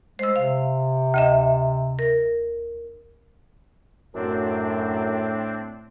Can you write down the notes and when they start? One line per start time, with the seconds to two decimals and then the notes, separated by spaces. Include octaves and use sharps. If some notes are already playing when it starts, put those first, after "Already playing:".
0.19 G#3 C5 E6
0.36 C3 F5
1.14 D2 D#5 E5
1.99 A#4
4.15 F#2 A2 C4 D4